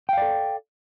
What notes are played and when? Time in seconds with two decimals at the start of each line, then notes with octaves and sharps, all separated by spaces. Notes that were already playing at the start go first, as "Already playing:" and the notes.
0.09 G5
0.13 F5
0.17 D5
0.22 A4